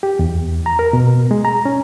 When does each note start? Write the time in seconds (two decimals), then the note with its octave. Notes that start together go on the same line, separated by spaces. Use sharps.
0.03 G4
0.19 E2
0.66 A#5
0.79 A#4
0.93 B2
1.31 G#3
1.45 A#5
1.65 C#4